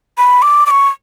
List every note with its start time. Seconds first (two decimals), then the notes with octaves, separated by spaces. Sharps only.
0.18 B5
0.42 D6
0.66 D6
0.71 C#6